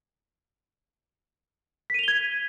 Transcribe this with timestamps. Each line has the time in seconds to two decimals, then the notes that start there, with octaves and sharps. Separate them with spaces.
1.90 B6
1.94 D#7
1.99 F7
2.03 G7
2.08 G#6